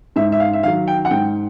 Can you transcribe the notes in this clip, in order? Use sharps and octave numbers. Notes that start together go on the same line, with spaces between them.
G#2 E5
E5
F5
E5
D#3 F#3 F5
G5
F#5
G#2 G5